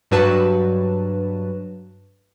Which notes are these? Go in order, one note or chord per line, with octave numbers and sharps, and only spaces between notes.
G2 F#3 F#4 B4 A5